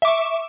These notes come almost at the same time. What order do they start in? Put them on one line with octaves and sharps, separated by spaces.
E5 D6 C#6